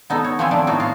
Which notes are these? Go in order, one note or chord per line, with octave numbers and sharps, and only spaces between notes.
B3 D#4 A4
C#5
F3 B3 C4 E5 G#5
D#3 A3 D4
A2 B3 D#4 F#4
F4 F5